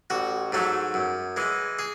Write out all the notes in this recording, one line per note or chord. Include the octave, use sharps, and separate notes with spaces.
A1 F#4
G#2 F#3 A3
F#2
E3 G#3
G#4